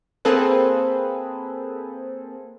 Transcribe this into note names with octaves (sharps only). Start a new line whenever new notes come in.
A#3 C4 G#4 A4 B4